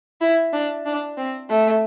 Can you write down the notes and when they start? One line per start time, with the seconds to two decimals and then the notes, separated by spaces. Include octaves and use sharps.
0.21 E4
0.52 D4
0.85 D4
1.17 C4
1.50 A3